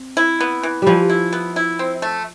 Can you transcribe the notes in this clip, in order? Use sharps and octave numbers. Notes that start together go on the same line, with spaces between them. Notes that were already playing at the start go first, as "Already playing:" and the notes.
Already playing: C4
E4
B3
E3
E3 F3 G3
E4
B3
E4
C4
A3